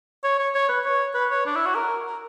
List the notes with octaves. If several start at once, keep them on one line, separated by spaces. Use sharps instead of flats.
C#5
C#5
C#5
B4
C#5
B4
C#5
D4
E4
F#4
A#4
A#4